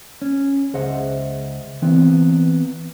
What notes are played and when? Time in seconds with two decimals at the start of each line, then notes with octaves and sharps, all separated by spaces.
0.22 C#4
0.74 C#2 G#4 C5 D#5 E5 F#5
1.82 E3 B3 C4